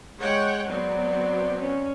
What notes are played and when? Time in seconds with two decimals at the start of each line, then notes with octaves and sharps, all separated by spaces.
0.21 G#3 C#5 F#5 G5
0.69 F#3 B3 C4 D5
1.60 C#4